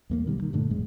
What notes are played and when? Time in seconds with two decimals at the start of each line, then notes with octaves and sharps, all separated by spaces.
0.10 E2 A3 A#3
0.26 B2 D#3 G3
0.38 D2 D#3
0.53 G2 A#2 D3 A3
0.70 G#1 F2 A2 G#3